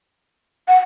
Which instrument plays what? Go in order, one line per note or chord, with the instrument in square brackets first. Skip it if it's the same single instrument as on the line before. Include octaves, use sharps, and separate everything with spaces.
[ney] F#5